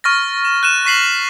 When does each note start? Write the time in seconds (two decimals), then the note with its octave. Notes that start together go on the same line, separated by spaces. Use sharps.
0.04 C#6 F6 A6 A#6
0.45 E7
0.63 F#6 D#7 E7
0.85 C#6 B6 C7 F#7